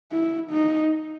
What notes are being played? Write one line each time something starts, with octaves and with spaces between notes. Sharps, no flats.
E4
D#4